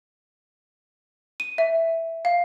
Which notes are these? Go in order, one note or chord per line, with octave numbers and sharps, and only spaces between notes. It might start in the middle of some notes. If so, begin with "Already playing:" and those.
D#7
E5
F5